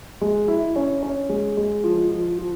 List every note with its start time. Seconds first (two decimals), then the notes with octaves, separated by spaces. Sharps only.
0.21 G#3
0.48 E4
0.76 C#4
1.03 C#4
1.29 G#3
1.57 G#3
1.84 F3
2.11 F3
2.39 F3